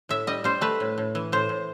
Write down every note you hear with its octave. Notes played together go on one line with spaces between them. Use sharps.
A2 E5
G3 D#5
G3 C5
A3 B4
A2
A2
E3
A2 C5
A2